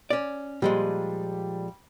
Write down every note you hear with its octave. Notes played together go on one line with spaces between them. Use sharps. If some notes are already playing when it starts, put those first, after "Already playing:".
C#4 D5
A#2 F3 G3 G#3